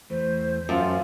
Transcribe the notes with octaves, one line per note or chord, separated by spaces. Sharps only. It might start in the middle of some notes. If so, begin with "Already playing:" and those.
E2 E3 A3 C5
F#2 F4 A4 A5